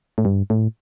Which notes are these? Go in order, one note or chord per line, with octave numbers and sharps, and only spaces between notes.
A2
G2
A2